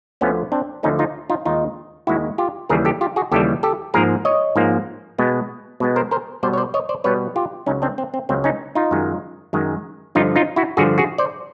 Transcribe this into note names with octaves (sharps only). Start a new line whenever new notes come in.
D2 D3 F3 A3 B3 C#4
C4 D4
D2 D3 F3 A3 C#4 D#4
D#4 F4
D#4 F4
D#2 D#3 G#3 D#4 F4
D#2 D#3 G#3 E4 F#4
F4 G4
D#2 C#3 E3 G3 G#4 A#4
G4 A4
F4 G4
F#4 G#4
D#2 C#3 E3 G3 G4 A4
G4 A4
G#2 F3 A#3 G#4 A#4
C#5 D#5
G#2 F3 A#3
B2 G#3 B3
B2 G#3 B3
A#4 C5
A#4 C5
B2 G3 B3 C5 D5
C#5
C5 D5
C#5 D#5
C5 D5
B2 G3 B3 B4 C#5
F4 G4
C#2 C#3 F#3 C#4 D#4
C4 D4
C4
C4
C#2 C#3 F#3 C4
C#4 D#4
D#4 F4
F#2 D#3 G#3
F#2 D#3 G#3
G2 D3 F3 D#4 F4
D#4 F4
E4 F#4
G2 D3 F3 F#4 G#4
F#4 G#4
C5 D5